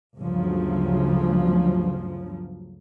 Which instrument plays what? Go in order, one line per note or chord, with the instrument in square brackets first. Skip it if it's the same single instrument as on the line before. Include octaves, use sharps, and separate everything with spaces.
[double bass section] G1 D2 C#3 F3 F#3